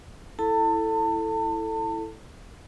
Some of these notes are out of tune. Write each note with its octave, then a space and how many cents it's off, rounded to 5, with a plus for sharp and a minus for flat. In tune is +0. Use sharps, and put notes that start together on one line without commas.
E4 +0 A4 +0 A5 +35